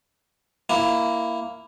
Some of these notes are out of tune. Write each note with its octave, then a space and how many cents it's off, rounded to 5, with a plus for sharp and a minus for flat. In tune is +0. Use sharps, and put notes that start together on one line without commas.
A#3 +0 E4 +10